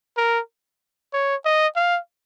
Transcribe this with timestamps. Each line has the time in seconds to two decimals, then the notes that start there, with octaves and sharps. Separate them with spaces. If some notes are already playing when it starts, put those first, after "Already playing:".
0.17 A#4
1.13 C#5
1.45 D#5
1.76 F5